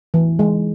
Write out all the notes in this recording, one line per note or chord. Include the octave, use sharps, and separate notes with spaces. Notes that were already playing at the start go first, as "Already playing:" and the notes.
E3
G#3